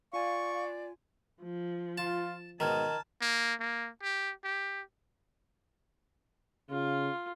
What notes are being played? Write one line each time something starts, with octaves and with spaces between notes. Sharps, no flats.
F4 D5 F5 G#5 C#6
F3
F4 A5
G#2 B2 D#3 D#5 A5 A#5 F6 G#6
A#3
A#3
G4
G4
C#3 F4